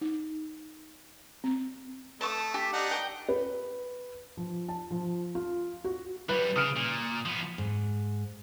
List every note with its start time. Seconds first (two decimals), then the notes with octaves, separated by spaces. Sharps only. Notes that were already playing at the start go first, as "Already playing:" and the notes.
0.01 D#4
1.44 C4
2.21 A3 A5 C#6 D#6
2.54 G4
2.73 D4 D#4 F#5
2.91 G5 D#6
3.29 B4
4.37 F3
4.68 A5
4.91 F3
5.35 F4
5.84 F#4
6.29 F#2 G3 B4
6.56 C#3 D#6 F6 D7
6.76 A#2
7.26 F3 B3
7.58 G#2